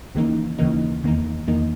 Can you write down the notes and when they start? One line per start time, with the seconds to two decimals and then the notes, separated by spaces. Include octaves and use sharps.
0.15 D#2 C#3 E3 A#3 D#4
0.59 D#2 C#3 E3 A#3 D#4
1.04 E2 D#3 A#3 D#4
1.47 E2 D#3 A#3 D#4